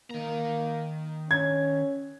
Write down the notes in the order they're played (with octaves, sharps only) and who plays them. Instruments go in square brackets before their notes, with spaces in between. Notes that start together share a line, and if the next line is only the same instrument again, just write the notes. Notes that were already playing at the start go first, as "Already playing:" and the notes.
[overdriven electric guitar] D#3 A#5 [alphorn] A#3
[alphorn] C#4 [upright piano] G#6